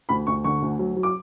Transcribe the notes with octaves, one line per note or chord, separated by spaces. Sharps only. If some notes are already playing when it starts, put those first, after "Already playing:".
D2 B5
D2 C#6
D3 C#6
D2
F#3
F#3
D6